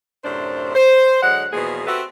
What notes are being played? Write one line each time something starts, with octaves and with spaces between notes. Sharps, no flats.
F#2 A2 C3 D4 C5
C5
D3 F#3 G#3 F#5
E2 B2 F3 A#3 G#4
C4 F#4 G4 A4 B4 E5